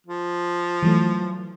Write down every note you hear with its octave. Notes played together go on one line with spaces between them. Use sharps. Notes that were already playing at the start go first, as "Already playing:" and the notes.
F3
E3 F#3 A3